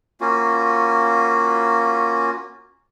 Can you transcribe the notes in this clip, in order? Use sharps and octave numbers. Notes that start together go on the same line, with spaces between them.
A#3 C#4 F4 F#4